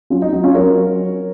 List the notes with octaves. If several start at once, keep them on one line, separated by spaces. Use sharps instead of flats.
F#3 C#4 F4
D#4
F#3 D#4
C#4 F4
F#3 A#4 C#5